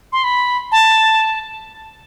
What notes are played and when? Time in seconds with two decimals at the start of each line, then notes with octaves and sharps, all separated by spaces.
0.13 C6
0.24 B5
0.72 A5